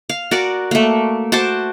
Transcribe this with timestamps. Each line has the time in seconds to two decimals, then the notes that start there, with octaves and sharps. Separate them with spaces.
0.09 F5
0.31 F#4 A#4 D5
0.71 A3 A#3
1.32 F#4 C5 A5 D6